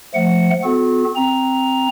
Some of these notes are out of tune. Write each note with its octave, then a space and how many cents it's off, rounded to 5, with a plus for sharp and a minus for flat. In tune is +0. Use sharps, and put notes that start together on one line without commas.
F3 +0 A3 -5 F#5 +0
B3 +45 F#4 -40 A4 -35
C4 +0 A#5 +5